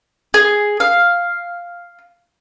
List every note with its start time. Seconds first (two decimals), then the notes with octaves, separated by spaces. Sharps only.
0.34 G#4
0.80 F5